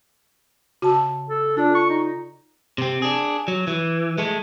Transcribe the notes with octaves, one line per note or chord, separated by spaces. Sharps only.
C#3 F#4 A5 E6
A4
D4 F4 A4 D5
C#6
D#4 D#5
C3 C4
D4 G#4
F#3
E3
G#3 A3